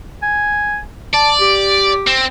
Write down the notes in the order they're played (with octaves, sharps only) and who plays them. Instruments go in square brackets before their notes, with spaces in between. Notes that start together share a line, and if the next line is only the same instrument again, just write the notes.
[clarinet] G#5
[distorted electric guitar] D5 [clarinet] A5
[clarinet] G4
[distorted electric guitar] C4